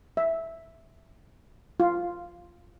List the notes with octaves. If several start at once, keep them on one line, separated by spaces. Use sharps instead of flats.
E5
F4